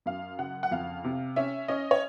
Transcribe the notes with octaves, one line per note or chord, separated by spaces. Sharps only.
F#2 F5
C#3 F#5
F#5
F2 F5
C3
C#4 E5
C#4 D#5
C#5